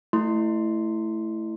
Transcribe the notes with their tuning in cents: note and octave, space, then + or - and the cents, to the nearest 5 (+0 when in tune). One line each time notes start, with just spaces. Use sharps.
A3 +0 E4 +0 C6 +0